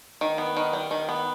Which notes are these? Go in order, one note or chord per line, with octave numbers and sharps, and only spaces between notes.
D#3
B3
D#3
G3
D#3
B3